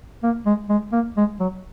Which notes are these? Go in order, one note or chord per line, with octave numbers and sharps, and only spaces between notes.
A#3
G#3
G#3
A#3
G#3
F#3